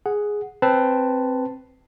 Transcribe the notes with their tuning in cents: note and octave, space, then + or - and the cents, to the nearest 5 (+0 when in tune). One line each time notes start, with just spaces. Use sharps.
G#4 +0 F#5 +0
C4 +5 B4 +10 A5 +0